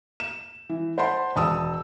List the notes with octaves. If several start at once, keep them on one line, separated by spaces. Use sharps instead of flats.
E7
E3
C5 F#5 A5 B5 C6
E1 A5 D#6 E6